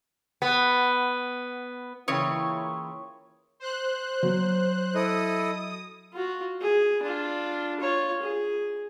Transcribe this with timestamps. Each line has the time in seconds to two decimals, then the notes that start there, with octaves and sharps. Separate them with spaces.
0.42 B3
2.08 C#3 E3 A#3 E4 F4 C#5 G5 D#6
3.60 C5 F#6
4.23 F#3
4.95 E4 A4 D#5 D#6
6.13 F4 F#4
6.61 G#4
7.02 D4 F4
7.80 F4 C#5
8.22 G#4